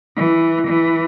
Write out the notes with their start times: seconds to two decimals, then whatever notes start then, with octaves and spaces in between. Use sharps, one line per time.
0.16 E3
0.67 E3